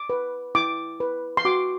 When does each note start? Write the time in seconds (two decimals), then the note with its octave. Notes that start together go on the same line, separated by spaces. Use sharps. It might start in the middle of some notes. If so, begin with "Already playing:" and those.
Already playing: D6
0.10 B4
0.55 E4 D6
1.00 B4
1.37 C6
1.45 F#4 D6